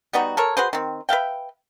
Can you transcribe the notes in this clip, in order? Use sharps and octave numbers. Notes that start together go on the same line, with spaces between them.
G3 B3 D#4 F#4
A4 A#4 C#5
F#4 G#4 B4 C5
D#3 C4
B4 E5 F5 G5